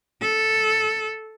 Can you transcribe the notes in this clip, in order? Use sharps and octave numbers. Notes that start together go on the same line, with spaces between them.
A4